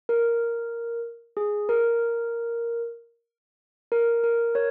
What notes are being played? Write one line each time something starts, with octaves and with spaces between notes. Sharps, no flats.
A#4
G#4
A#4
A#4
A#4
A#4 C#5